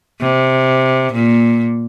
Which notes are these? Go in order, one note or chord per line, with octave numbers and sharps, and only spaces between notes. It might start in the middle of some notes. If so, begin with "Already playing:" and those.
C3
A#2